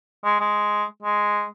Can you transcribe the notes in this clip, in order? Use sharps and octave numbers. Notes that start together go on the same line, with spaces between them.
G#3
G#3
G#3